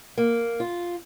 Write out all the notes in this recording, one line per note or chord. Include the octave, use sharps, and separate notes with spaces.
A#3
F4